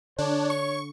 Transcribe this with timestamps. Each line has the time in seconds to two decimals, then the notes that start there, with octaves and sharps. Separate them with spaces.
0.18 D3 D4 C#5
0.50 C#6